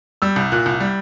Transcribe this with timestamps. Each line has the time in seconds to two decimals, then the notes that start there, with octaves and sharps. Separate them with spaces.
0.22 G3 E6
0.36 C2
0.52 A#2 F#6
0.66 C2
0.80 G3